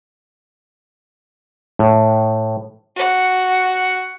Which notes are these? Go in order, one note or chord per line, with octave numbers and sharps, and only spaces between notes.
A2
F#4 F#5